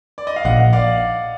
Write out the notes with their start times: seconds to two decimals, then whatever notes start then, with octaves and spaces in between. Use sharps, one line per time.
0.18 D5
0.27 D#5
0.36 F5
0.45 A#1 D#5 F#5
0.73 D5 F5